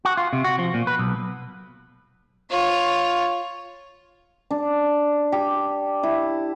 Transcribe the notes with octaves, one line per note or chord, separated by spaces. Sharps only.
F#4
F4
C3
F#4
F3
A#2
B4
B1
F4 C#5
D4
G4
E4